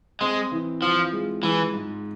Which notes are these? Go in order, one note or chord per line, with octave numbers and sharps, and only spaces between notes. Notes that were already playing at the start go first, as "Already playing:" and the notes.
G#3 C4
E3
F3 F4
G#3
E3 G#3
G#2